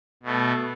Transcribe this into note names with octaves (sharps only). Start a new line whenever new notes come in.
B2 A3